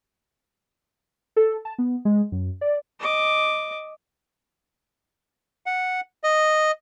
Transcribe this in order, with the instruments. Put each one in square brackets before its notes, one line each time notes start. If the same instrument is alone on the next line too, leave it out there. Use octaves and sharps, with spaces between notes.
[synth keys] A4
A5
B3
G#3
F#2
D5
[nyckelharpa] D#5 D6
[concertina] F#5
D#5